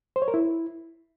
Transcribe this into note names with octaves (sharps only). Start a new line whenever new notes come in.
C5
C#5
A#4
E4